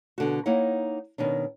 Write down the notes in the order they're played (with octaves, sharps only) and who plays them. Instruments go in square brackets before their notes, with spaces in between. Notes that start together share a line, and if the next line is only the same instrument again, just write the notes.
[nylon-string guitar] B2 D3 F#4
A#3 D#4 E4 C#5 F#5
B2 D#3 C#4 D4